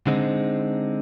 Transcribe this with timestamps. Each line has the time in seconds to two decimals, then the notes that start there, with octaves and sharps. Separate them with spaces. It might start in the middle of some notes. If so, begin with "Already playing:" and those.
0.07 D3 G#3 C4 D#4